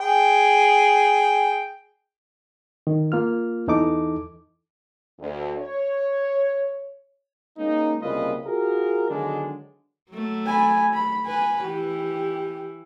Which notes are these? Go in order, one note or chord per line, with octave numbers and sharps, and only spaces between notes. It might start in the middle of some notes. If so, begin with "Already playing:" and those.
G#4 G5
D#3
A#3 F4 F6
E2 E3 D#4 A4 D6
D2
C#5
G#3 A#3 C#4 D#4
C2 C#3 A#3 F4 B4 D#5
F4 F#4 G#4 A#4
D3 D#3 F#3 G#3 B3 D4
F#3 A3
G#5 B5
B5
B4 G#5
E3 G4